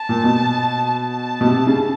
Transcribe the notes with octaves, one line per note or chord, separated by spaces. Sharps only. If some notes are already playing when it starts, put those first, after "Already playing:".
Already playing: A5
A#2
B2
A5
B2
C3
C#3